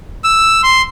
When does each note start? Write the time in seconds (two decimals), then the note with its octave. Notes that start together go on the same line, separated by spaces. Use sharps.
0.24 E6
0.63 C6